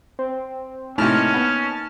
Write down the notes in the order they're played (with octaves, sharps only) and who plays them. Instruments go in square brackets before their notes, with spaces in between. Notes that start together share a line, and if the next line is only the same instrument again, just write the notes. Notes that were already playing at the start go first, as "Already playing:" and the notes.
[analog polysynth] C4
[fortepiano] A2 C3 [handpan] A#3 D#4 [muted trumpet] C#4 [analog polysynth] A5 F6
[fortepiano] B3